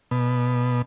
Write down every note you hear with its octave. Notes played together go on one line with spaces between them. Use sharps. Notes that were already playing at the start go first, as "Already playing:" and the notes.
B2